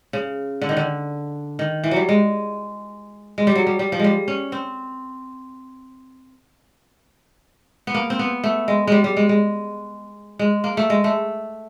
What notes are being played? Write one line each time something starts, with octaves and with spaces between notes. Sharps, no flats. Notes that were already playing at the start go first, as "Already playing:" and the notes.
C#3
D3
D#3
D3
D#3
E3
F#3 G3
G#3
G#3
G3
F#3
G3
G3
F3
G3 G#3
C#4
C4
B3
A#3
C4
B3
A3
G#3
G3 G#3
G3
G#3
G#3
G#3
A#3
A3
G#3
A3